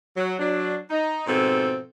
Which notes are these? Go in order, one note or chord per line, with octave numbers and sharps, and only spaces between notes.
F#3
F#3 D4
D#4
G#2 B2 F3 C4 A4